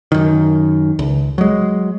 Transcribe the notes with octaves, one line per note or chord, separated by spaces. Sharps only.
F#2 D#3
C#2
F#3 G#3